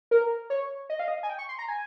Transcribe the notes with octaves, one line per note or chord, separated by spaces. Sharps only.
A#4
C#5
D#5
F5
D#5
G#5
G5
C#6
C6
A#5
G#5